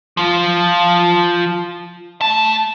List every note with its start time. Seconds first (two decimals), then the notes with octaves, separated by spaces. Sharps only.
0.17 F3 F4
2.21 A3 A5